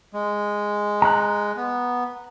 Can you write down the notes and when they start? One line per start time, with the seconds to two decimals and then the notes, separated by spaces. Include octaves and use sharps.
0.13 G#3
1.02 A#5 F#6
1.56 B3